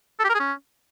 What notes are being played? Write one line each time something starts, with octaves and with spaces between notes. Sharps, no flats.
A4
G4
A#4
G#4
C#4